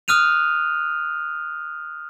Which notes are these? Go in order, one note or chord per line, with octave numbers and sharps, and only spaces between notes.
D#6 F6 F#6 D#7 F7